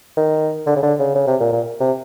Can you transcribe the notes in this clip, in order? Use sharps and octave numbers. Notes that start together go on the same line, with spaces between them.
D#3
D3
C#3
D3
C#3
C#3
C3
A#2
A#2
C3